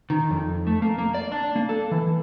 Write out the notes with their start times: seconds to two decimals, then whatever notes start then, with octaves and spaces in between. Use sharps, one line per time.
0.10 D#3
0.31 F2
0.67 A3
0.82 A#3
0.98 A#3
1.14 D5
1.32 D4
1.56 A#3
1.69 A4
1.91 E3